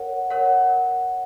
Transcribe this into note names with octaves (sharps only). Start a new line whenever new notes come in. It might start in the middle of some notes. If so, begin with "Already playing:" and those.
Already playing: A#4 C#5 F#5
A#4 C#5 F#5